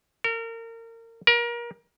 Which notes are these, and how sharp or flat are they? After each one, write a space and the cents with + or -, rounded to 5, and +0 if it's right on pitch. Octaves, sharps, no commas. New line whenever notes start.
A#4 -30
A#4 +30